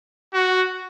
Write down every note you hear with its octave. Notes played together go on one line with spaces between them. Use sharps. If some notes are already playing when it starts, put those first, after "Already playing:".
F#4